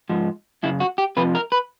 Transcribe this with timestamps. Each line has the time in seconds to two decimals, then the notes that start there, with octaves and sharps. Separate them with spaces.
0.09 G#2 F3
0.63 F#2 C#3 E4
0.80 F#4
0.98 G4
1.17 F2 C3 F3 B4
1.35 A#4
1.52 B4